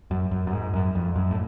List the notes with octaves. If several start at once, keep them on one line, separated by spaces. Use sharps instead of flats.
F#2
F#2
F#2
G#2
F#2
F2
F#2
A2